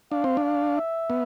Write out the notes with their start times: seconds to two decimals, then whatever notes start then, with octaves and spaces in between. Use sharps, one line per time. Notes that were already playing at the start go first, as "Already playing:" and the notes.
0.11 D4 F5
0.24 C4
0.37 D4
0.44 F5
0.77 E5
1.10 B3